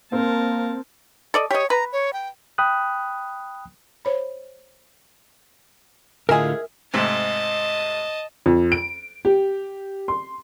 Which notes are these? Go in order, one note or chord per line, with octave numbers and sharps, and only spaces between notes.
A#3 C4 A#4 A5
A4 D5 D#5
G4 C#5 D#5
B4 A#5
C#5
G5
G5 B5 D#6 F#6
C5 C#5 B5
A2 D3 G#3 F4 G#4 A#4 E5 G#5
G#2 C3 A3 D#5 A5
F2
D7
G4
C6